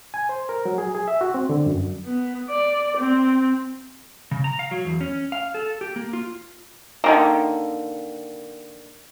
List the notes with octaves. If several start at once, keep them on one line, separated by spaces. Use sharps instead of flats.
G#5
C5
A#4
F#3
G#4
G#4
E5
F#4
C4
D3
F#2
B3
D5
C4
C#3
A#5
F5
F#3
E2
C#4
F5
A4
G4
A#3
F4
D3 D#3 A#3